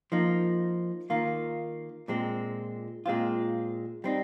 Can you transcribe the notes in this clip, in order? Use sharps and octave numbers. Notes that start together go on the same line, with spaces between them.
F3 A#3 D#4
D#3 A#3 F4
A#2 G#3 C4
A#2 G#3 C4 F4
G3 C4 D#4